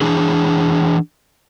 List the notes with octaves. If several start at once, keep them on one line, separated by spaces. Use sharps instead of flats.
E3 D4 G#4